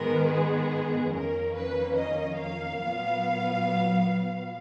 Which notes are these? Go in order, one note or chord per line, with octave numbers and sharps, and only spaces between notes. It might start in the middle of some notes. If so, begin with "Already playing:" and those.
Already playing: G#2 D#3 G#3 B3 A#4
G#4
F2 D#3 A#3 C#4 A#4
B4
D#5
F5
A#2 F#3 B3